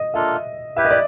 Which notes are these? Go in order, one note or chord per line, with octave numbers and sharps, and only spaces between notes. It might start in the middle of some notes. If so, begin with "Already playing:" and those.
Already playing: D#5
A#3 D4 F4 A4 E5
E4 G4 B4 E5
D#5
D5